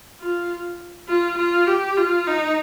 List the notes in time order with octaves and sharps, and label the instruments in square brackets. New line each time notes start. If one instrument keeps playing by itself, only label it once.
[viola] F4
F4
F4
G4
F4
D#4